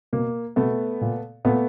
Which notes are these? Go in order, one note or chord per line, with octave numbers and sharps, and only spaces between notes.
B2 A#3
B2 A3 B3
A#2
A#2 A3 B3